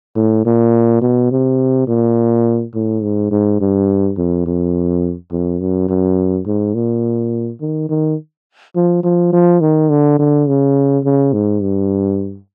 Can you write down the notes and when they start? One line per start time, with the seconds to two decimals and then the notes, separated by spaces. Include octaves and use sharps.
0.16 A2
0.46 A#2
1.02 B2
1.32 C3
1.88 A#2
2.75 A2
3.03 G#2
3.31 G#2
3.61 G2
4.18 F2
4.46 F2
5.32 F2
5.60 F#2
5.89 F#2
6.47 G#2
6.75 A#2
7.61 D#3
7.89 D#3
8.76 F3
9.04 F3
9.33 F3
9.61 D#3
9.90 D3
10.19 D3
10.48 C#3
11.04 C#3
11.33 G#2
11.62 G2